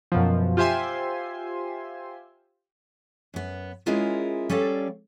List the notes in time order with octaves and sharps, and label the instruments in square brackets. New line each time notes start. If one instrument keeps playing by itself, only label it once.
[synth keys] F#2 B2 F3
F4 G4 C5 E5 G#5 C6
[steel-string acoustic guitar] F#2 B3
G#3 C#4 E4 F4 G#4 A#4
G3 C#4 A4 D5 F5